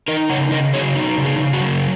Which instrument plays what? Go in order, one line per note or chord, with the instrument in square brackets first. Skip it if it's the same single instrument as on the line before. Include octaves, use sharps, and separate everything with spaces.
[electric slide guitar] D#4 A#4 D#5
C#3 C#5 F#5
C#3 A#4 D#5
F#3 G#4 C#5
D#4
C#3
G#4
C#3
F#4
F#3